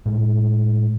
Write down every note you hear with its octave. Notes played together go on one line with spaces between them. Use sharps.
A2 G#3